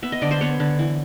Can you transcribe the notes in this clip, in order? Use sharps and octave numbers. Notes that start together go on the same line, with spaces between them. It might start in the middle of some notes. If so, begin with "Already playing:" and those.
B3 E5
D#5
D3 D5
C5
B3 C#5
D3
E3